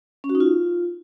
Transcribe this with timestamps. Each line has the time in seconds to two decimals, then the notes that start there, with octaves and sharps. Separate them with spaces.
0.24 C#4
0.29 F#4
0.35 D#4
0.40 F4